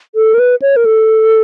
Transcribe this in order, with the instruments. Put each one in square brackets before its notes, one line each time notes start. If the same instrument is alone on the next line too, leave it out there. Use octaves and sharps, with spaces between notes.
[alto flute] A4
A#4
B4
C#5
A#4
A4